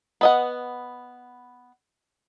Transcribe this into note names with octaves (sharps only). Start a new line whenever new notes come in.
B3 D#5 F#5